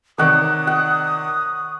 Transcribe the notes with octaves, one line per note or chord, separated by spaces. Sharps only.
C3 D#3 C#5 D5 F#5 D#6
F#5